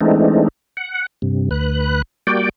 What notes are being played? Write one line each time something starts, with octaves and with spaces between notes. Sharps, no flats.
E3 G#3 A3 C4 D4 D#4
F#5
G2 C3
D2 B4 F#6
G3 A#3 F#4 D5 G5